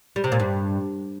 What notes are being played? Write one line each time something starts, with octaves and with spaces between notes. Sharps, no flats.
G3
C3
A#2
G2